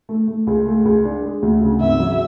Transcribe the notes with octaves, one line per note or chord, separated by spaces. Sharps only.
A3
A3
C#2
A3
C#2
D4
G#3
D2
C#3
G#1 E5
F#3